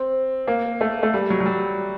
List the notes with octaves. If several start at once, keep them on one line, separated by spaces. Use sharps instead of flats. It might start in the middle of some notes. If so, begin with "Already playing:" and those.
Already playing: C4
A#3
A3
A3
G3
F#3
F#3
G3